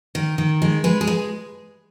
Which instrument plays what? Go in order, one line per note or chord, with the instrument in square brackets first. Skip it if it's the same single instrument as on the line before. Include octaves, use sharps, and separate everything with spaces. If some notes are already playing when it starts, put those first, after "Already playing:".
[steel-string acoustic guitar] D#3
D#3
G#3
G#3 B4
G#4
G#3